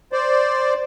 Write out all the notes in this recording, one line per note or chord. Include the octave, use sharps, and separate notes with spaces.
C5 D5